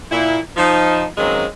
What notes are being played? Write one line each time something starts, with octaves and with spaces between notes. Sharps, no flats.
A#2 E4
F3 D#4
D#3 F#3 G#3 A#3 C4 C#4